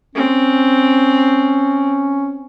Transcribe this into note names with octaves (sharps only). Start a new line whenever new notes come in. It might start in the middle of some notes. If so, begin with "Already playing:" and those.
C4 C#4